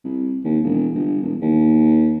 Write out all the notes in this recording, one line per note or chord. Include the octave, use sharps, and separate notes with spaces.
C2
D#2
E1
G1
E1
D#2